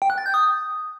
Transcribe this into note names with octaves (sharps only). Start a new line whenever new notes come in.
G5
F#6
A6
G6
D#6